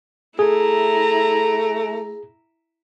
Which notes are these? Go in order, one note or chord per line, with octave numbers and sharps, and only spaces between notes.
A3 E4 G#4 A#5